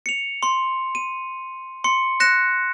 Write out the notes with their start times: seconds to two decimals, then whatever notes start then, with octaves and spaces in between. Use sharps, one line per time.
0.06 C#7 F7
0.43 C6
0.95 D#7
1.84 C6 C#7
2.20 F#6 A#6 C#7 E7